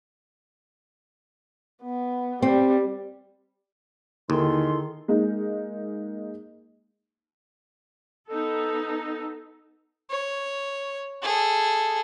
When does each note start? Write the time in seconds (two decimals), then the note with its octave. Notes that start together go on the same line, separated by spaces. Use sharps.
1.83 B3
2.42 G3 C4
4.30 D#2 D3 D#3 E4 G#4 A4 C6
5.08 G#3 A#3 D#4
8.29 B3 D#4 A4
10.10 C#5
11.23 G#4 A4